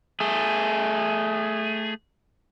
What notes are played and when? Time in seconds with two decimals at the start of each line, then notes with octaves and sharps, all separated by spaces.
0.20 A3 G#4